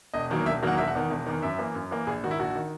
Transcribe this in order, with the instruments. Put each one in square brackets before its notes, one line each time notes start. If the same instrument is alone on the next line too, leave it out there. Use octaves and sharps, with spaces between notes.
[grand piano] E1 D#5
E2 D#3 F#3 A#3
E1 E5
E2 D#3 F#3 A#3 F#5
E1 E5
F#5
E2 D#3
E1
E2 D#3
F#2 E5
E3 A#3
F#2
E3 A#3
A#1 G#4
G#2 D#3 F#4
E4
A#1 F#4
D#3